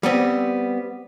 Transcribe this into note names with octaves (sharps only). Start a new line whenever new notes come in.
G3 B3 C4